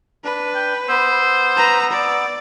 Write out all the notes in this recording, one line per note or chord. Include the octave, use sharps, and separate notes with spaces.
D4 B4
G5
B3 C5 E6
B4 A#5
D5